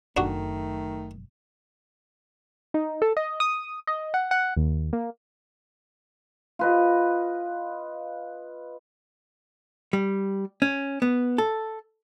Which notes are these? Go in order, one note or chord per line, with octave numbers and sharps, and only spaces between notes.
F#1 F#2 D#3 A3 D4 F#4
D#4
A4
D#5
D#6
D#5
F#5
F#5
D#2
A#3
F4 B4 D#5
G3
C#4
B3
A4